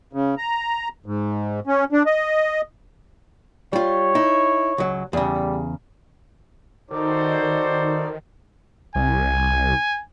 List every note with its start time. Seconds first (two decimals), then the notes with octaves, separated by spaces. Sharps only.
0.13 C#3
0.38 A#5
1.06 G#2
1.67 C#4
1.92 D4
2.06 D#5
3.73 G3 F4 C#5
4.15 D#4 E4
4.78 C#2 F#3
5.13 E2 C#3 G3
6.91 D#3 D#4 F#4 A4 C5 D5
8.95 C2 G#5